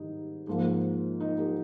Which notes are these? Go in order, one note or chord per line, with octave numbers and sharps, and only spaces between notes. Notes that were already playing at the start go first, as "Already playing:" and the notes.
Already playing: G#2 D#3 G3 D#4
G#2 F3 A#3
D#4
G4